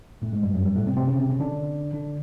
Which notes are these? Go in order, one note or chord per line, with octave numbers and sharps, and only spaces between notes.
A2 A3
G#2 G#3
G2 G3
F#2 F#3
G2 G3
A2 A3
C3 C4
C3 C4
C#3 C#4
C3 C4
C#3 C#4
D3 D4
D3 D4